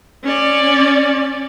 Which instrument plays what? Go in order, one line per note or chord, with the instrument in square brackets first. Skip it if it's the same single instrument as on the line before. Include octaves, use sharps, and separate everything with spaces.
[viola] C#4 D5